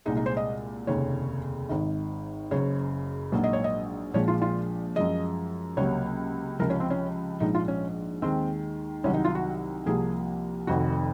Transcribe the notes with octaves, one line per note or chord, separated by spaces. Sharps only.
C2 A#2 G#3 D#4
D#4
C5
D#5
F1 D#2 C#3 C#5
G#1 G#2 D#3
F#1 F#2 C#3 C#5
A#1 G#2 F#3 A#3
D#5
C#5
D#5
A#1 A#2 F3 G#3 C#5
F4
F4
F#2 F3 G#3 D#5
C#2 C3 F#3 A#3 C#5
C#2 C3 F3 A#4
C#4
C4
C#4
A#1 G#2 F3 D#4
F4
C#4
D#2 D#3 G#3 C4
C2 C3 D#3 F#3 C#4
D#4
F4
F#4
C2 C3 F3 A#3 G#4
F1 F2 D#3 F#4